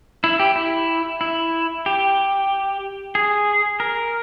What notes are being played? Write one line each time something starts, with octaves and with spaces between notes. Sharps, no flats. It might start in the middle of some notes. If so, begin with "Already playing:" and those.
E4
G4
E4
E4
G4
G#4
A#4